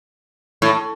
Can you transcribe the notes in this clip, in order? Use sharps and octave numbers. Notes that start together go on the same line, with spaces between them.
A2